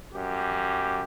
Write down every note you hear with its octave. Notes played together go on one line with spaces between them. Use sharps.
F#2 G4